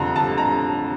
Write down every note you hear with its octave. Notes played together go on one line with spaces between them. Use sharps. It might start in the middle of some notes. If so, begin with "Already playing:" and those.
Already playing: F2 D3 G3 A#5 C6
A5
A#5